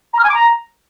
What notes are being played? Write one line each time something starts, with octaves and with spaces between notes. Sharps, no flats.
A#5
F6
G#5
D6
A#5